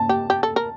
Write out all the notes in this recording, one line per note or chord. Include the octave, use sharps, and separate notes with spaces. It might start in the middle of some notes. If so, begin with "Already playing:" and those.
Already playing: A5
G4
G4
A4
A#4